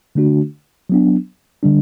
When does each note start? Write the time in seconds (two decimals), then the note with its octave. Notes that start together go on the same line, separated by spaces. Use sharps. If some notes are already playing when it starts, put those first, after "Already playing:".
0.15 D3 A3 D4 F#4
0.90 F#3 B3 D4
1.63 D3 G3 D4